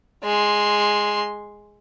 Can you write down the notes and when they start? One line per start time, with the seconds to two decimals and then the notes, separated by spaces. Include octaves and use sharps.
0.24 G#3 C6